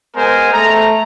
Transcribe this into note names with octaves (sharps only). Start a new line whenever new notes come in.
G#3 B3 A#4 C5 G#5
A3 A#5